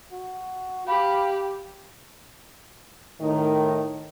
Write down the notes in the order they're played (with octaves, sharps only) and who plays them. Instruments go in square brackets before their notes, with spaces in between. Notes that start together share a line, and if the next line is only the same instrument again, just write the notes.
[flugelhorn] F#4
[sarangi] G4 [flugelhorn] F5 [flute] B5
[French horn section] A2 D#3